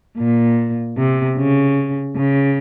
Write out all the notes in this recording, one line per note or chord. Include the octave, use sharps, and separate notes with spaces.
A#2
C3
C#3
C#3